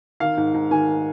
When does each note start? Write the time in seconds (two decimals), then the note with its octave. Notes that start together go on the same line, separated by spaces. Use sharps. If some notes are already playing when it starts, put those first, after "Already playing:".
0.20 D#3 F5
0.37 G#2
0.54 G#2
0.71 D#3 G#5